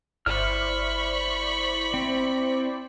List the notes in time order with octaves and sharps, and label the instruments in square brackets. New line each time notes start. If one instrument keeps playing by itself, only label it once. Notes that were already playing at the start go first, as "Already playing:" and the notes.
[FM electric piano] G1 [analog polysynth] E4 C5 D5 [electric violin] B5 C#6 [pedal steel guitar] F6
[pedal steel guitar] C4